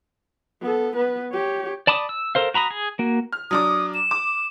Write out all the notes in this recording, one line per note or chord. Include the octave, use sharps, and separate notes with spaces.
B3 A4
B3 B4
G4 C#5
D5 A5 B5 D6 D#6
E6
A4 A#4 C5 F5
F#4 A#5 B5 D#6
G#4
A#3 F#4
F6
F#3 D4 D6 D#6
E7
D6